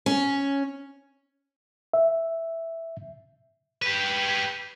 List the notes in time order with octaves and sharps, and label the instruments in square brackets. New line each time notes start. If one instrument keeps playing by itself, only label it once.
[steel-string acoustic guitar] C#4
[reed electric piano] E5
[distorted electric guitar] G4 B4